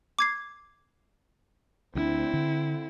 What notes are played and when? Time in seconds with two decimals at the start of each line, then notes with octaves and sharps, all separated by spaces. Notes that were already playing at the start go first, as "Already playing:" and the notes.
0.19 D6 G#6 C7
1.95 D2 G3 C4 D4 E4
2.33 D3